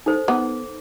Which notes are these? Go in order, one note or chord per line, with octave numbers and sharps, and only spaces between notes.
D#4 A4 C5
B3 D6